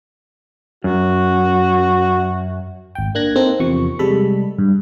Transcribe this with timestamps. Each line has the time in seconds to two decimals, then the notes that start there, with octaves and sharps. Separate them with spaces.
0.84 F#2 F#4
2.95 G#1 G5
3.15 A#3 D4 F#6 G#6 A#6
3.35 A#3 C4 D#4 A4
3.60 E2 C3 F3 C#6
3.99 C3 G3 G#3 A4 B5
4.58 G2